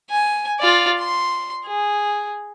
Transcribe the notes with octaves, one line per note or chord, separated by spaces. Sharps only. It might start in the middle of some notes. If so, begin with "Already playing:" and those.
G#5
F4 D5
C6
G#4